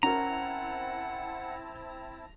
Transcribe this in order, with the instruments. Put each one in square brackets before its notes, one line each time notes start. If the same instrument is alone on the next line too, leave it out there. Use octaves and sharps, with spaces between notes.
[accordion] C4 E4 A5 [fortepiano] C#4 A#4 [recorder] F#5 [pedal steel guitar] A#5